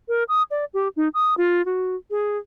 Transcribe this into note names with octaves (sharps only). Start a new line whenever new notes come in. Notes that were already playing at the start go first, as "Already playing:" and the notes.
A#4
D#6
D5
G4
D#4
D#6
F4
F#4
G#4